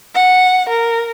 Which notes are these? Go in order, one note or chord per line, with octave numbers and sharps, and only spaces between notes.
F#5
A#4